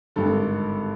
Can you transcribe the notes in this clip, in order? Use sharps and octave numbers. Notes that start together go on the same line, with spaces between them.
G#1 G2 D3 A4